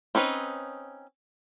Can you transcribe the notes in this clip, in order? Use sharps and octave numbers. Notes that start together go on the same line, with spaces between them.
C4 C#4 D#4 B4